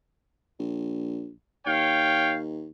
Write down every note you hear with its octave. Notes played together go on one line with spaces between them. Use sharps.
A#1
D#2 C#5 F5 G5